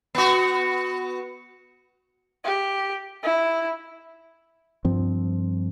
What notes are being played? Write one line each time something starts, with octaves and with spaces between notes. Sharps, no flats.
B3 F#4
G4
E4
G2 F3 C4